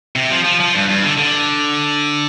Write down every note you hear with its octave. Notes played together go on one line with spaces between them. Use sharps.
C3
F3
F3
F3
G2
G2
D3
D3